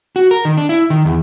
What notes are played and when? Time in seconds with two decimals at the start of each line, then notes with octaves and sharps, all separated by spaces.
0.16 F#4
0.31 A#4
0.45 D#3
0.57 D4
0.69 E4
0.90 D#3
1.05 E2